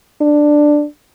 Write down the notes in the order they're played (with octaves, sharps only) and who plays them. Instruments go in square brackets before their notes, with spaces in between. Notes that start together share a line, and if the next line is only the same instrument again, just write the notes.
[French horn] D4